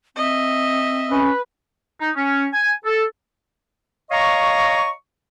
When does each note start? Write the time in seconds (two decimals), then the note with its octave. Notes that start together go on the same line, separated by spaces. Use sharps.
0.16 C4 D#5 E5
1.11 C#4 B4
2.00 D#4
2.15 C#4
2.53 G#5
2.85 A4
4.11 C#5 D#5 F5 A#5 C#6